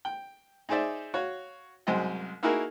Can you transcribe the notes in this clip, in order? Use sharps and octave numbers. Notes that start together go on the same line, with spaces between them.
G5
D#4 G#4 C5 D5 E5
F#4 C#5 F5
C2 F#2 G#3 C5 D#5 G5
A#3 D#4 E4 F#4 G#4 A#4